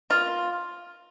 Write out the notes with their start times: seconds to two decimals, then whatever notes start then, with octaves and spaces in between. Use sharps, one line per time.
0.10 A#3 F4